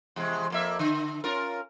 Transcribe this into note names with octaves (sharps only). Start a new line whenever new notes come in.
E2 C3 G#3
F2 A#3 E5
D3
C#4 F4 A#4